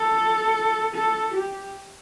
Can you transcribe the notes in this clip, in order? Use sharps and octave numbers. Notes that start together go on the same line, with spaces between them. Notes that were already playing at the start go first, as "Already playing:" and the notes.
Already playing: A4
A4
G4